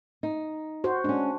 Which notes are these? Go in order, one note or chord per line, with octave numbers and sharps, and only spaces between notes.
D#4
F#4 C5
G#3 C#4 D4